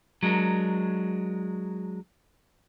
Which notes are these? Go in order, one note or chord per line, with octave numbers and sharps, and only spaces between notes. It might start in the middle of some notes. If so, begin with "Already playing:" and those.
F#3 G#3 D4 A#4